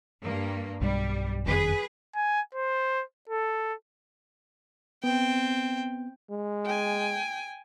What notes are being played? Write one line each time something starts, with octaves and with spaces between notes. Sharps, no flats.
G2 A#3
B1 G2 G3
F#1 F2 D#3 G#4 B4
G#5
C5
A4
B3 C4 G5
G#3
G5 G#5